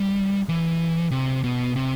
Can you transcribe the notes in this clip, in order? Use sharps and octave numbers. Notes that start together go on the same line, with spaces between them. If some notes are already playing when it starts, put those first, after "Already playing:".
Already playing: G3
E3
C3
B2
C3